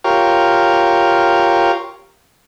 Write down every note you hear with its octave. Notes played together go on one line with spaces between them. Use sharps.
F4 G4 A#4 C#5